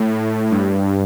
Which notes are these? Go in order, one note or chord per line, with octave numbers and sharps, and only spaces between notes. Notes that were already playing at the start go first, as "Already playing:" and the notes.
Already playing: A2
G2